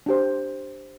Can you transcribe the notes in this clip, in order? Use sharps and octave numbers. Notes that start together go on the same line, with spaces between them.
D4 G4 C5